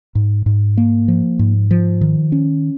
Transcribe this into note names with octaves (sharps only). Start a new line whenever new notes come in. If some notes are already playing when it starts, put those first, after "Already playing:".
G#2
G#2
A#3
F3
G#2
F3
D#3
C#4